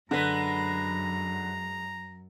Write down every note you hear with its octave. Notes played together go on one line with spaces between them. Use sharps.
F#2 D3 G#3 B4 A#5